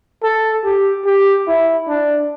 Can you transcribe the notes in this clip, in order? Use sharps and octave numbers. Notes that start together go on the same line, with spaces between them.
A4
G4
G4
E4
D4